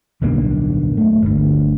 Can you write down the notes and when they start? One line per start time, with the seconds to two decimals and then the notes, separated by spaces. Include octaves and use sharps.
0.21 D1 B1 G2 A#3
0.97 A3
1.22 G1 D2